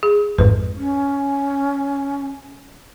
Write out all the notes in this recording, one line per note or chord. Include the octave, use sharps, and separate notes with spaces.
G#4
A1 F2 G#2 B4
C#4